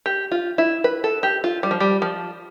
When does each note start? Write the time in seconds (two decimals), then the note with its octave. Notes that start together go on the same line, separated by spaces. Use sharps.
0.06 G4
0.32 F4
0.58 E4
0.84 B4
1.04 A4
1.23 G4
1.44 F4
1.63 G3
1.71 F3
1.80 G3
2.02 F3